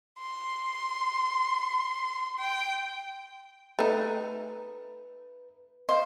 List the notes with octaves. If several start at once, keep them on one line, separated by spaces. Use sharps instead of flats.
C6
G5
A3 D#4 B4
C5 D#5 F5